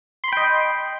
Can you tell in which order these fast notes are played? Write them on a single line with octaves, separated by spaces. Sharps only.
C6 B5 G5 D#5